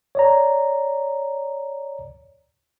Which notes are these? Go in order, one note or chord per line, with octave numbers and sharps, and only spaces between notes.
C#5 D5 A#5